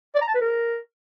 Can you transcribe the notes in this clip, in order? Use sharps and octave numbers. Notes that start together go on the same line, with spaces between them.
D5
A#5
A5
B4
A#4